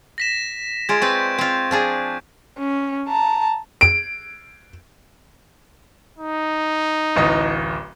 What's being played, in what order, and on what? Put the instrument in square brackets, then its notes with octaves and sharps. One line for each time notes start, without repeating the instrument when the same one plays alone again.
[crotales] A#6 B6 E7
[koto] G#3 F4 [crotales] G#6 D7
[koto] C4 B4 D5 [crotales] C#6 G6
[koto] C4 F4
F3 D4 G#4
[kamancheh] C#4
A5 A#5
[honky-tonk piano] D7
[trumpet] D#4
[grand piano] D1 A1 D#5